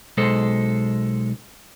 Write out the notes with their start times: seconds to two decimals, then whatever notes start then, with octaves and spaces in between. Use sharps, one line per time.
0.17 B1 G#3 A4 C5